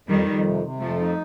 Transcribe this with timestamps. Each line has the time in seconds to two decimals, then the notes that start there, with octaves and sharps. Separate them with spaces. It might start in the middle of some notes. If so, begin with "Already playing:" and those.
0.09 F2 D#3 G3
0.27 F2
0.46 C3
0.63 C3
0.81 F2 F3 A3
0.99 D#4